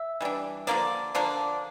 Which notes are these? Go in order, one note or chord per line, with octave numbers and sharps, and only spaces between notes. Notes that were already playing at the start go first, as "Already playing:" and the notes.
Already playing: E5
E3 G3 D4
D3 F3 A#3 D4 D5
D3 F3 A#3 D4